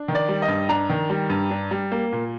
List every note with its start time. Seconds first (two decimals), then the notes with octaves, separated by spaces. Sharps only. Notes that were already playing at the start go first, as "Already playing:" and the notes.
Already playing: D4
0.08 D#3
0.15 D5
0.29 G3
0.42 D#5
0.48 G2
0.69 D4 A#5
0.89 D#3
1.10 G3
1.30 G2
1.51 D4
1.71 G3
1.92 A#3
2.13 A#2